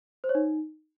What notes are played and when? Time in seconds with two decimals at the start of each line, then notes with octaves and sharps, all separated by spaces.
0.24 C5
0.29 C#5
0.35 D#4